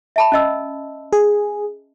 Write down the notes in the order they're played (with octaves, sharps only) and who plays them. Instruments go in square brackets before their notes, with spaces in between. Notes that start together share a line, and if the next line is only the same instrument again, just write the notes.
[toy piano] E5 A5 B5
C#4 D#5 E6
[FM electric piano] G#4